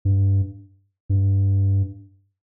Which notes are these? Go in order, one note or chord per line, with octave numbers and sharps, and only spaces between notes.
G2
G2